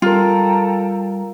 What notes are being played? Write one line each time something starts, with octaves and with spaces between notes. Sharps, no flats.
G3 F4 A4 A#4 G5 A#5